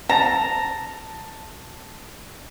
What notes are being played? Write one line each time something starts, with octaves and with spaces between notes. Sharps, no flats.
A5 A#5 A6 E7